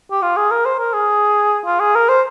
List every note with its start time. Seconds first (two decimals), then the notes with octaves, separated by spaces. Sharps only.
0.11 G4
0.22 F4
0.36 G#4
0.51 A#4
0.65 C5
0.79 A#4
0.93 G#4
1.66 F4
1.80 G#4
1.95 A#4
2.08 C5